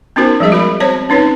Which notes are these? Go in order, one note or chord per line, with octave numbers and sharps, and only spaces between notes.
B3 C#4 D#4 F#4 A#4 C5
F3 G3 G#3 G#4 D#5
F#4 A#4 B5
C4 F#4 C5 C#5 A5
C4 C#4 D#4 B4 C#5